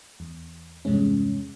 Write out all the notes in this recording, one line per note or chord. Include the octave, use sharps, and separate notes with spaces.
E2
E2 G2 C3 G#3 C#4